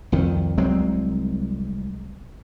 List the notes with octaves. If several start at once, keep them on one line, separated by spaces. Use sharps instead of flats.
C2 F2 D#3
C2 F#3 G#3 C4